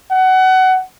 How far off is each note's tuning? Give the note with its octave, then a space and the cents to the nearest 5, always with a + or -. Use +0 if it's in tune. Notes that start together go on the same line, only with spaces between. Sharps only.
F#5 +20